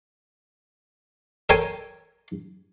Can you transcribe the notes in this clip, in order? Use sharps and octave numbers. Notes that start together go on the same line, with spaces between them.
A4 A#4 C5 C#5 G5 G#5